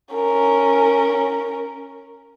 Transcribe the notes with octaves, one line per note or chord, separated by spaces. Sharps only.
C#4 A#4